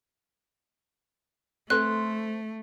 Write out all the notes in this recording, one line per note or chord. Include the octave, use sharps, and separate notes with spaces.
A3 C4 A4 B4 C5 F#6